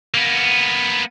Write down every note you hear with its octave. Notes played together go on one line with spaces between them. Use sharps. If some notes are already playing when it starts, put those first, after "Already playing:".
A#3 B3